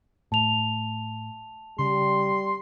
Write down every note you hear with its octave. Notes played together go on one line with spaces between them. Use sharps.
A2 A5 F7
C#3 G3 C6